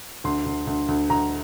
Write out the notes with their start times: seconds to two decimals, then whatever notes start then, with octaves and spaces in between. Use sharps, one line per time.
0.24 D2 C6
0.46 D2
0.67 D2
0.88 D2
1.10 D2 A#5